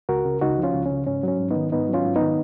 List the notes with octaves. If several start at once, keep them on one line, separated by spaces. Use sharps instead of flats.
C#2 F#4 A#4
C#3
C#2 D#4 F#4
F3
C#4 F4
C#2
C#4
C#3
G#2 C#4
F#3 C#4
G#2
D#3 B3 D#4
G#2 B3 D#4
F#3
C#4 F4
G#2
B3 D#4
D#3